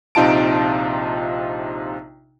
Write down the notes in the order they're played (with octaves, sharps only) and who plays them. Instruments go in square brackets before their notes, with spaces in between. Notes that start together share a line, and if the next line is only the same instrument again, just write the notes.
[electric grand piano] A#1 C3 D#4 F4 A5 D7